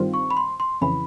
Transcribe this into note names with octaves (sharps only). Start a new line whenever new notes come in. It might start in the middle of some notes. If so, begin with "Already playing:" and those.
Already playing: G2 D#3 G3 C4 F4
C#6
B5
C6
C6
F2 C#3 E3 B5